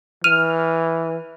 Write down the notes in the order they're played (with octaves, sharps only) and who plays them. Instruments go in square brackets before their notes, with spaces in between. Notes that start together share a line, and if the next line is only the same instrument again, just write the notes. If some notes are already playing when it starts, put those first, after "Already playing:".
[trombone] E3 [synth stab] F6 [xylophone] D#7